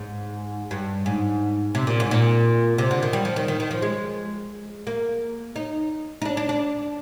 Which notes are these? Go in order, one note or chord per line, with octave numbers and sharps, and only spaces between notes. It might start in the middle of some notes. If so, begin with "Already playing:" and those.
Already playing: G#2
G2
G#2
C3
A#2
G#2
A#2
C3
D3
D#3
G3
F3
D#3
D#3
D#3
F3
G#3
A#3
D#4
D#4
D4
D4
D4